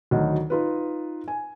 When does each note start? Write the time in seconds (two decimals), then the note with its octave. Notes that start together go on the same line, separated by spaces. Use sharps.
0.11 D2 D#3 F#3 D#5
0.50 D#4 F4 B4
1.28 G#5